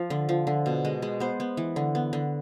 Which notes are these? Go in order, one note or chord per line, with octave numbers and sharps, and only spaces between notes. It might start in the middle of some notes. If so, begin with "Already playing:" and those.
Already playing: F3
D3
F3
D3
B2
G#3
G#3
B3 C5
B3
E3
D3
B3
D3